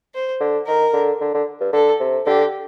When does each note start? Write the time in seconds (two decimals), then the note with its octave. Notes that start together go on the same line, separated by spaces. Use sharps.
0.14 C5
0.40 D3
0.67 D#3 A#4
0.93 D3
1.21 D3
1.34 D3
1.61 G2
1.73 D3 A4
2.00 C3
2.26 D3 G4